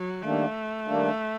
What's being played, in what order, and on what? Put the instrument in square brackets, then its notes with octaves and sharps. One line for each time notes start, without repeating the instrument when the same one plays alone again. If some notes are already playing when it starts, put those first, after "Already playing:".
Already playing: [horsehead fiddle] F#3
[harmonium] D#3 G3 A#3 D4 [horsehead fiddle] A3
[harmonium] D#3 G3 A#3 D4